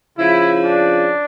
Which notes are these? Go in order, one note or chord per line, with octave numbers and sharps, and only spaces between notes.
C#3 F3 E4
D4